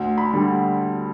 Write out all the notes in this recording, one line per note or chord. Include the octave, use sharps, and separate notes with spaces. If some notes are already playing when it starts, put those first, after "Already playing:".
Already playing: D2
B5
D3 G3